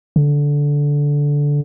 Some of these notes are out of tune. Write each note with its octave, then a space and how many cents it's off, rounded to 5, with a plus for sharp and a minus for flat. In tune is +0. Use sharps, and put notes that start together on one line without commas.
D3 -15